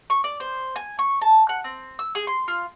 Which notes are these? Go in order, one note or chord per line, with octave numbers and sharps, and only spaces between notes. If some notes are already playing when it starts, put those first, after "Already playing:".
C#6
D5
C5
G#5
C#6
A5
F#5
C4
E6
G#4
C6
F4